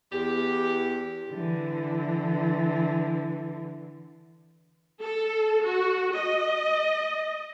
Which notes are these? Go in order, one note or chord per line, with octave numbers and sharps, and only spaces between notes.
E2 G4
D3 E3
A4
F#4
D#5